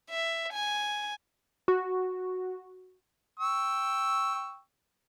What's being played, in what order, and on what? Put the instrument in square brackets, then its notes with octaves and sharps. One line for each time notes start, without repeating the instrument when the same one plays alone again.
[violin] E5
G#5
[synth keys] F#4
[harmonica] G5 C#6 E6